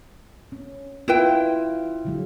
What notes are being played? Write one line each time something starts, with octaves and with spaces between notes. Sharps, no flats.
C#4
E4 F4 B4 G5
D3 F#3 G#3